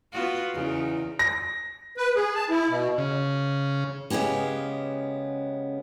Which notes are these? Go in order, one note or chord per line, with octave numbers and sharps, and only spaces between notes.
B3 F4 F#4
E2 C#3 D#4
A#6
B4
G#4
A5
E4
B2
C#3
C#3 G#3 B3 C#4 G4